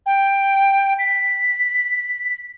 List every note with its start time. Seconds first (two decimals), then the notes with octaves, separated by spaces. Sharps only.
0.06 G5
0.99 B6